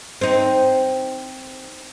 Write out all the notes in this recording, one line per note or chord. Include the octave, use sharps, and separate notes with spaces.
C4 D#4